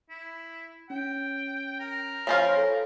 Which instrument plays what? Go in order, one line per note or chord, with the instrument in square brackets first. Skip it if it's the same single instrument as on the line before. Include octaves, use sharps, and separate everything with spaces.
[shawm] E4
[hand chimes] C#4 [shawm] G5
[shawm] A#4
[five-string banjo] F3 C#4 F4 [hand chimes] C#5 F5 F6
[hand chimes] A4 A#6